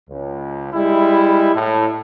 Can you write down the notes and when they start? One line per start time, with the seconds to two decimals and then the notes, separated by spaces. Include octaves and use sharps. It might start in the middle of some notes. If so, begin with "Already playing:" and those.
0.10 C#2
0.73 G3 G#3 E4
1.54 A2